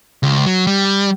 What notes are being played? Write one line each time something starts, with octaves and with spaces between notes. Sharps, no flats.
C#2
F#3
G3